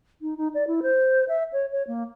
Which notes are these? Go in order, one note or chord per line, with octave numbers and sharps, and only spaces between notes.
D#4
D#4
D5
E4
C5
E5
C#5
C#5
A#3